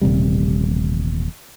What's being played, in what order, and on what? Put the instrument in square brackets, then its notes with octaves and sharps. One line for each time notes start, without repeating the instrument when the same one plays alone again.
[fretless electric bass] D#1 A1 C3 G3